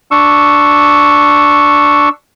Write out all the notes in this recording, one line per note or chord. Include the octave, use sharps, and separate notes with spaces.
D4 C#6 E6